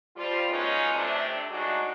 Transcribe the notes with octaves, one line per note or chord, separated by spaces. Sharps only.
F3 G3 F4
F#3 G#3 B3 C#4 D#4 F4
C3 A3 D4
A2 G#3 D4 D#4 F#4